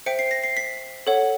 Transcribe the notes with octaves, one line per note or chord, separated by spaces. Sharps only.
C5 E5 G5 C#7
C7
A#6
C7
B6
A4 C#5 F#5